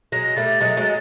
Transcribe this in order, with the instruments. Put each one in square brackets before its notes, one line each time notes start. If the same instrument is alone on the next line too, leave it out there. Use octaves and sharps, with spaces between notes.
[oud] F#3 G#3 [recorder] A#6
[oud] G3 A3 [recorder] A6
[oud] F#3 G#3
F#3 G#3